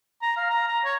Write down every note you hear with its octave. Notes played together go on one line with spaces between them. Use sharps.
A#5
F5
A#5
A#5
C#5